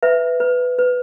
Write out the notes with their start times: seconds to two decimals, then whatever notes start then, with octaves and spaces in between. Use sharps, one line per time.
0.03 B4 E5
0.40 B4
0.79 B4